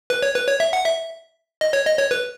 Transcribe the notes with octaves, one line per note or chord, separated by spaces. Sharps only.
B4
C#5
B4
C#5
E5
F#5
E5
D#5
C#5
D#5
C#5
B4